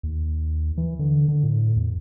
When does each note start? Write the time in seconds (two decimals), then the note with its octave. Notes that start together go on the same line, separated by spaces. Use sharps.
0.03 D#2
0.77 E3
0.99 D3
1.28 D3
1.43 A2
1.76 E2